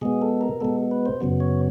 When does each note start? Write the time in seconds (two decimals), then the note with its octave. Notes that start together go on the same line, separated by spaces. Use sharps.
0.01 B2 G#3 B3 G#4
0.22 A4
0.41 A#4
0.61 B2 G#3 B3 A4
0.91 B4
1.06 C5
1.21 F#2 C#3 F#3 B3
1.40 C#5